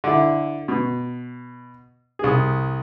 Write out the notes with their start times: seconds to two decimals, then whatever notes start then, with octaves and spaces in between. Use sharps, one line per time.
0.04 D3 E4
0.68 B2
2.19 C2 G#4